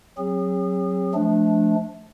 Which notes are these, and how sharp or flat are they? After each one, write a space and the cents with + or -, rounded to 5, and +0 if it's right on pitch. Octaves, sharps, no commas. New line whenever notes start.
F#3 +0 C4 +30 G#4 -30
F3 -10 A3 -25 D4 +0